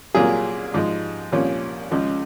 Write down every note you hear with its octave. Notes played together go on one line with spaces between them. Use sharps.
C2 A#2 F#3 A#3 F4 G#4
G#2 F3 G#3
C2 A#2 F3 C#4
C#2 C#3 F3 G#3